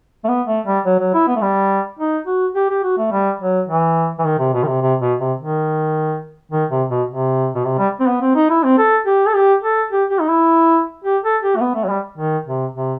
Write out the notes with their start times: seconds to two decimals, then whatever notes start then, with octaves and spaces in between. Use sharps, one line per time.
0.24 A3
0.28 B3
0.47 A3
0.67 G3
0.85 F#3
0.99 F#3
1.14 E4
1.28 B3
1.36 A3
1.42 G3
1.99 D#4
2.26 F#4
2.55 G4
2.69 G4
2.84 F#4
2.98 A3
3.12 G3
3.40 F#3
3.68 E3
4.19 E3
4.25 D#3
4.39 C3
4.53 B2
4.63 D#3
4.67 C3
4.81 C3
5.01 B2
5.19 C3
5.39 D#3
6.52 D#3
6.70 C3
6.90 B2
7.09 C3
7.55 B2
7.65 C3
7.78 G3
8.00 C4
8.07 B3
8.22 C4
8.36 D#4
8.50 E4
8.64 C4
8.78 A4
9.06 G4
9.27 A4
9.35 G4
9.63 A4
9.91 G4
10.10 G4
10.20 D#4
10.29 E4
11.04 G4
11.24 A4
11.42 G4
11.56 A3
11.61 B3
11.75 A3
11.84 F#3
11.89 G3
12.18 D#3
12.46 C3
12.74 C3